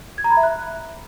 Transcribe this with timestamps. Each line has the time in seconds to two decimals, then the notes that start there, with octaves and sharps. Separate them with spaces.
0.18 G#6
0.24 A#5
0.31 B5
0.37 E5
0.43 F#6